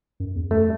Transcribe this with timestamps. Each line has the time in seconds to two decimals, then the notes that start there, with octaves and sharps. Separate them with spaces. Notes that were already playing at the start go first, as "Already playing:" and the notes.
0.20 F#2
0.35 E2
0.51 F#2 A3